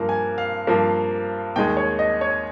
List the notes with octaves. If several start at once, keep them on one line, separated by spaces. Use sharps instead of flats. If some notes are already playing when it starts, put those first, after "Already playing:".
Already playing: G2 F3 A#3
G#5
F5
G2 F3 A#3
D#2 D#3 G#3 G5
C#5
D#5
C#5